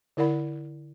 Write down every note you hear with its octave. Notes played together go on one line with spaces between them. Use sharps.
D3 E4 A#4 D5 F#5 B5